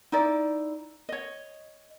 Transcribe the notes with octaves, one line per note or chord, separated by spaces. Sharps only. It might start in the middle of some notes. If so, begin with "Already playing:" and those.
D#4 E4 D5
C#5 D#5